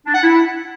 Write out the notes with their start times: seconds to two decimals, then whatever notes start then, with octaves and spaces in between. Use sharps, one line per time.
0.06 D4
0.15 F#5
0.23 E4